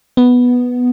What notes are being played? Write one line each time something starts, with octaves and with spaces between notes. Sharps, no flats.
B3